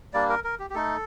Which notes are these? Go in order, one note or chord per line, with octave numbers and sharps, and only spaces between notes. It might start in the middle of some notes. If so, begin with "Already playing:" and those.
G3 A#3 D4 D5
A#4
A#4
G4
G4
A3 D#4 A4